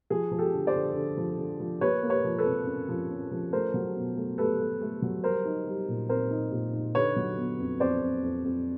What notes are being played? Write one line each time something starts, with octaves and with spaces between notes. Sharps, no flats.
F3 G#4
F3
G4 A4
D3
C5 D5
D3
D3
F3
D3
F3
A#3 B4 C#5
A#3
B4 C#5
F3
A4 B4
C3
C#4
F3
C#4
F3
A3 A#4 C5
F#3
B2
A3
A3 A4 B4
A3
A3
F#3
G3 A#4 C5
D#4
G3
A#2
C4 A#4 C5
D#4
A#2
D#4
D3 B4 C#5
F#3
B3
F2
F2 C5 D5
F2
F2
F2